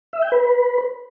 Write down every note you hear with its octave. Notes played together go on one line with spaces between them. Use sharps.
E5
G5
B4